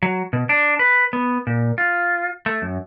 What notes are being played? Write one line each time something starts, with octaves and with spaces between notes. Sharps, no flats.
F#3
B2
D4
B4
B3
A#2
F4
A3
F#2